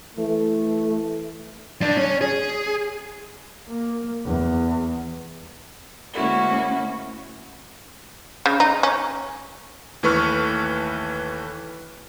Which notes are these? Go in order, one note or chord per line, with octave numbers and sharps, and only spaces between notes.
E3 A3
G2 D4
C#4 C#5
G#4
A#3
E2
D2 G#3 A#3 C#4 E4 F#4
C#3
D#4
C#4
D#2 E3 A3 B4 C#6 F6